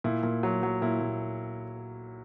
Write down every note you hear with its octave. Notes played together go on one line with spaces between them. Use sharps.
A#2 E4
A#2
F#3
F#3
A#2 E4
A#2